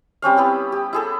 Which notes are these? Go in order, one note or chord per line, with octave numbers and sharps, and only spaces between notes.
G3 C4 C#4 F5
B3 E4 G4
G4
E4 G#4 A4